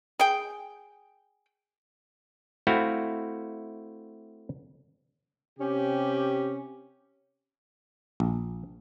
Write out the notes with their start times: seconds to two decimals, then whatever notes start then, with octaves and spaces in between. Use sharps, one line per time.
0.19 G#4 G5
2.67 A3 C4 E4 F#4 F5 G5
5.58 C3 C#4 G4
8.20 A#1